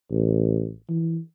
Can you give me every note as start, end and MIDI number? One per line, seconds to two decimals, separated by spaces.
0.11 0.71 33
0.89 1.19 52